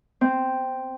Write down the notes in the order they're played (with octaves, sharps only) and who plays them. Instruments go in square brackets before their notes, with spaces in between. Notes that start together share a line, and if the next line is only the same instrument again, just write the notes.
[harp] C4